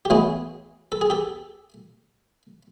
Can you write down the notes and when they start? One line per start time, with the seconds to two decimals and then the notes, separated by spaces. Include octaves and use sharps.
0.05 G4
0.10 A2 E3 G#3 B3 F#4 G#4
0.92 A4
1.01 G#4
1.10 G4 A4